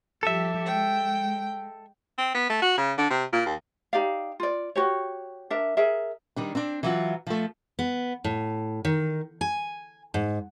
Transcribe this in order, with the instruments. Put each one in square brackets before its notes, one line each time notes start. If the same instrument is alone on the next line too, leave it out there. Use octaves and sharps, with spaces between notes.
[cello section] F3 G3 G4 [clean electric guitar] A4 E5
[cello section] G#3 [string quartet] G5
[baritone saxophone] C4
B3
A3
F#4
C#3
D3
C3
A#2
D#2
[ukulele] D#4 G4 D5 F5
F4 D5
F#4 G4 C#5
D4 A#4 E5
G#4 A#4 E5
[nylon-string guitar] D#3 G3 D4
C4 D4
E3 F#3 F4
F3 A3
[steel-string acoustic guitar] B3
A2
D#3
G#5
G#2